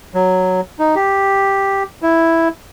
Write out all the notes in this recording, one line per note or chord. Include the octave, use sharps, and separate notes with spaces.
F#3
D#4
G4
E4